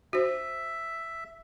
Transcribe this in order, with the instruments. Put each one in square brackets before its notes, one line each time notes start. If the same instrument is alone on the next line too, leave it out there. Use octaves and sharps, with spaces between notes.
[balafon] F#4 C5 [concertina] E5